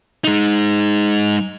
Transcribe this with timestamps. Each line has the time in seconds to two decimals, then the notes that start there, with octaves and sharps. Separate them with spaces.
0.24 G#3 D#4